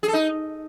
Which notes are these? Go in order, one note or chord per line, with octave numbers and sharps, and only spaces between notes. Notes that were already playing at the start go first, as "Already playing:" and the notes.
G#4
A4
D#4